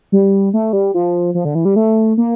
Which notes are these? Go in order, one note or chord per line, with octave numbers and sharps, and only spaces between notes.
G3
A3
G3
F3
F3
D3
E3
G3
A3
A#3